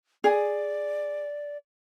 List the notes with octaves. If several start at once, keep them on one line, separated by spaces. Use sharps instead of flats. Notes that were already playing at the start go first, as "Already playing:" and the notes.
G#4 D5